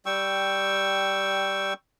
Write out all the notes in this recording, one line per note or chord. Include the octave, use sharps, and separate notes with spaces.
G3 G5 C#6 E6